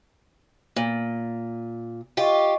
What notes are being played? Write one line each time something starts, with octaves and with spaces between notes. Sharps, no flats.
A#2
F4 G4 D#5 C#6